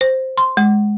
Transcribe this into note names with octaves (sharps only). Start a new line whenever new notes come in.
C5
C6
G#3